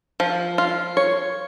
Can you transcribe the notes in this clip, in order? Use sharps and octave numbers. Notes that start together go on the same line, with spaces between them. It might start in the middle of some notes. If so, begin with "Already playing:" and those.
F3
F4
C#5